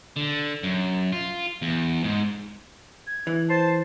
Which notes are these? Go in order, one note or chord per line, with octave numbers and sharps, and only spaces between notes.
D3
F#2
F4
E2
G#2
G#6
E3
C5 A5 C7